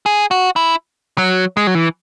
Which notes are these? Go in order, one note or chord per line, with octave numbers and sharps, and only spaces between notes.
G#4
F#4
E4
F#3
G#3
F#3
E3